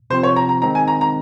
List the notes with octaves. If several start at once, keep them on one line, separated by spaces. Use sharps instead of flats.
C3 F3 C4 C5
C#5
A#5
A#5
D#3 G#3 C4 D#4 A#5
G#5
A#5
A#5